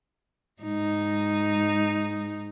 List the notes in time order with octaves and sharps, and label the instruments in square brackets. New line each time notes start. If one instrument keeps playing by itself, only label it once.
[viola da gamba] G#2 D#4